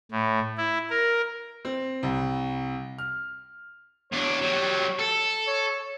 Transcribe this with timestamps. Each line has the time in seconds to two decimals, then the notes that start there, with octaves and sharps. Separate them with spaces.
0.12 A2
0.58 E4
0.90 A#4
1.65 C4
2.03 C2
2.98 F6
4.12 E2 D4 C#5
4.42 F#3 G3
4.99 A4
5.47 C#5